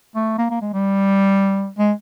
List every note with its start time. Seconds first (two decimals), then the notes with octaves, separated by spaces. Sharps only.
0.15 A3
0.38 A#3
0.50 A#3
0.61 G#3
0.74 G3
1.78 G#3